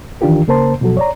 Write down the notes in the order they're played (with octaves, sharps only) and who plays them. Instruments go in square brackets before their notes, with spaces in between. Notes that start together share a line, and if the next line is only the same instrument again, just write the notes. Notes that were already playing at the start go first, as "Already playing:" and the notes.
[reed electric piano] D#3 E3 D4 F4 G4 A#4
C#3 A#3 A#4 C5 A5 C6
B2 F3 F#3 F#4 A4
C#5 D5 A#5